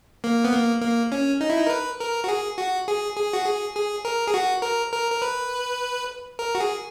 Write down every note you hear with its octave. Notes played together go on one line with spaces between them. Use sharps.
A#3
B3
A#3
A#3
C#4
D#4
E4
D#4
A#4
B4
A#4
F#4
G#4
F#4
G#4
G#4
F#4
G#4
G#4
A#4
G#4
F#4
A#4
A#4
A#4
B4
A#4
F#4
G#4